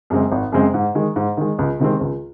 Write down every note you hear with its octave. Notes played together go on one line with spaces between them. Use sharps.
F#2 C#3 G#3 C4
G#1
F#2 C#3 G#3 C4
G#2
D#3 G#3
G#2
D#3 G#3
C#2
C3 D#3 G#3 C4
C#2